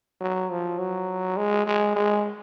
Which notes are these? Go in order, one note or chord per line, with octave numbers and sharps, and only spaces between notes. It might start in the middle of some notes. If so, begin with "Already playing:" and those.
F#3
F3
F#3
G#3
G#3
G#3